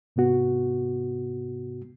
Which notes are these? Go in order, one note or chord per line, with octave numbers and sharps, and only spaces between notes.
G#2 C3 B3 F#4